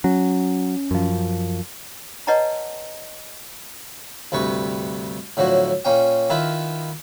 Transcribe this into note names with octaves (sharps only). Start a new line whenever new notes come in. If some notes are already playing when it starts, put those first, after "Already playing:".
F#3 C#4
F#2 F3
B4 C#5 D#5 F#5 A5 A#5
D2 G2 C3 B4 C#6
A2 D3 F3 F#3 F#4
A#2 A#3 C#4 G5
D#3 E4 F4 A#4 B4